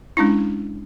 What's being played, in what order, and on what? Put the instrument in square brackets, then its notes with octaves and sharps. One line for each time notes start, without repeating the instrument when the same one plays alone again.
[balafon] G#3 C#4 D4 E4